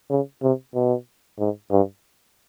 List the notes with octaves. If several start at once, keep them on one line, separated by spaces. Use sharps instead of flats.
C#3
C3
B2
G#2
G2